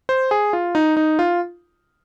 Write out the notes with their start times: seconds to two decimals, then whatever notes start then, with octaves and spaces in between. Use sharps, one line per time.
0.09 C5
0.31 G#4
0.53 F4
0.75 D#4
0.97 D#4
1.19 F4